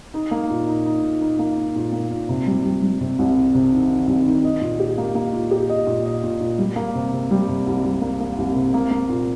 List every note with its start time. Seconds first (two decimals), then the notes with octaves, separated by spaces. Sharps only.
0.14 D#4
0.31 A#3
0.50 A#2
0.68 D#4
0.85 D#4
1.03 A#2
1.21 D#4
1.39 A#3
1.57 D#4
1.76 A#2
1.92 A#3
2.11 A#2
2.29 C3
2.47 G3
2.64 G3
2.82 G3
3.01 C3
3.19 C2
3.36 C3
3.55 C3
3.72 D#3
3.90 D#3
4.07 C2
4.26 D#3
4.44 D#5
4.61 A#2
4.80 G4
4.98 A#3
5.15 A#3
5.33 A#2
5.51 G4
5.69 D#5
5.87 A#2
6.05 D#5
6.24 A#2
6.41 A#2
6.59 G3
6.76 A#3
6.95 C3
7.13 C3
7.31 G3
7.48 C3
7.67 C2
7.84 G3
8.02 A#3
8.20 A#3
8.38 C2
8.56 C3
8.74 A#3
8.91 A#3
9.09 A#2